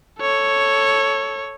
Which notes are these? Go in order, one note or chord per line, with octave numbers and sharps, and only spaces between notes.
A4 C#5